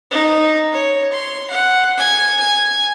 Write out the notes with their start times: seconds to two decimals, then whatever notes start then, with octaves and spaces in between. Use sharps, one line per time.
0.11 D#4
0.72 C#5
1.11 C6
1.50 F#5
1.97 G#5
2.39 G#5